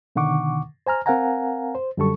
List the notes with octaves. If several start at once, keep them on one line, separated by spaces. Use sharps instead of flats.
B2 D3 D#3 F#5 C#6 D6
C5 G#5 A#5 F6
C4 A#4 F5 F#5 G#5 A#5
C5
F#2 D3 G3 A4 C#6